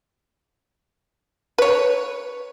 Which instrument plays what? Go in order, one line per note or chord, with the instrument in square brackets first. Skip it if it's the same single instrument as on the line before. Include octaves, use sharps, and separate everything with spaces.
[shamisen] B4 C#5